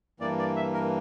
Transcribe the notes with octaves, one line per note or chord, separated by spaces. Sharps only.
G2 E3 A#3 D5
D5
E5
A#4